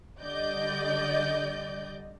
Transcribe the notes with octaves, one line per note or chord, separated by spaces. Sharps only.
D3 G3 D5 D#5 G6